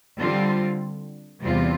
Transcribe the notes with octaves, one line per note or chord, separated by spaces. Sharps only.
D3 G3 C4 F4
E2 C3 G3 C4 F4